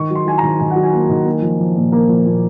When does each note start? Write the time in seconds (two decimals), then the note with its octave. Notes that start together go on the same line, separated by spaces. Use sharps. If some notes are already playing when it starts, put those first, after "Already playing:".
Already playing: D#3 C#6
0.10 F#3
0.15 C6
0.26 F#3 G#5
0.38 D#3 A#5
0.60 D#3 G#5
0.71 F#5
0.76 F#3
0.83 G#5
0.93 A#3
1.09 D#3
1.26 A#3
1.42 F3
1.59 F3
1.75 A#2
1.92 A#3
2.08 F3
2.26 A#2